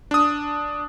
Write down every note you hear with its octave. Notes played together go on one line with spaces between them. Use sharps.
D4 D#6